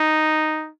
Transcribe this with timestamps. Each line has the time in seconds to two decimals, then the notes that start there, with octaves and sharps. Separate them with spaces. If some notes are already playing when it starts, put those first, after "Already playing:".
Already playing: D#4